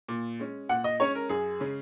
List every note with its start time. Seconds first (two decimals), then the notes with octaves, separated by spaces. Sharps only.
0.08 A#2
0.40 G#3 C#4
0.69 A#2 F#5
0.84 D#5
0.99 G#3 C#4 C#5
1.15 A#4
1.29 F#2 G#4
1.60 C#3 G#3 C#4